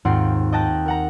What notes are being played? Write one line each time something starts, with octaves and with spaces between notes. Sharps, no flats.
D#2 G#2 C4 F4 F#5 C7
D#5 G5 A5 F#6 A#6
A#4 F#5 A#5